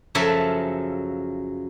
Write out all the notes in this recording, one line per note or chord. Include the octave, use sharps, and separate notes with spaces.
F#2 C#3 F3 F#3 A4 E5